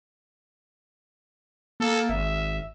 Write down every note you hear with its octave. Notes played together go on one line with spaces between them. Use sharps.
A#3 A4
G#1 E5